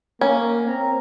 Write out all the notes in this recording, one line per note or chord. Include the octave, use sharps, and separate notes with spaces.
A#3 C#4
C4 A#5